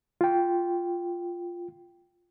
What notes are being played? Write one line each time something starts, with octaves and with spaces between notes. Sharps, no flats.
F4 G5